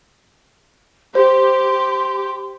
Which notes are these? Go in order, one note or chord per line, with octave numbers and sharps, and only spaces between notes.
G4 C5 C6